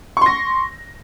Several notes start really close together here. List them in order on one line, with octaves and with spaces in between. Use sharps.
C#6 C6 A#6